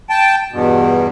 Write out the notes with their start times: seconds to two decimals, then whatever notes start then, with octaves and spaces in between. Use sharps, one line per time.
0.10 G5 A5
0.52 E2 G2 B2